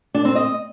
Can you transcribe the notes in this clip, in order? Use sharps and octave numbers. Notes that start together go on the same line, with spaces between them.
D4
C4
D#5